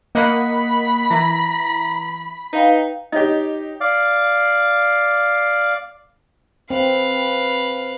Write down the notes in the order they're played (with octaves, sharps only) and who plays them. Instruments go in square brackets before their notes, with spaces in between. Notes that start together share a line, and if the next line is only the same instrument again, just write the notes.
[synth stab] A#3 D#5 F#5 [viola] B5
[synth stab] E3 [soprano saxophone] A#5
[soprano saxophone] D#4 [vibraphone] B4 F5 G5
[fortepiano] D#4 G4 [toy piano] C#5 D#5
[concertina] D5 F5
[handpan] C4 [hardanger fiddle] B4 F5